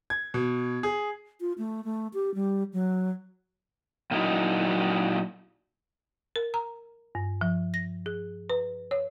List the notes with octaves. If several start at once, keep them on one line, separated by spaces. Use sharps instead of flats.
G#6
B2
G#4
F4
A3
A3
G4
G3
F#3
A#2 F#3 D#4 E4
A#4
A#5
G2
F3
A#6
G#4
B4
C#5